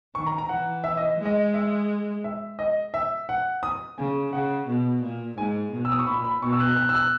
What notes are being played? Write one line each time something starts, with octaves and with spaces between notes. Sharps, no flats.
D#3 C#6
A#5
A#5
E3 F#5
E5
D#5
G#3
D#5
E5
E5
D#5
E5
F#5
D#6
C#3 G#5
C#3 F#5
B2
A#2
G#2 G#5
B2
E6
D#6
C#6
A#2 B5
B5
B2 C#6
E6
F#6
F#6
E6
F#6